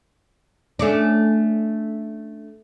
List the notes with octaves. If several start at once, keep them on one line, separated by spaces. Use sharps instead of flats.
A3 C#4 D4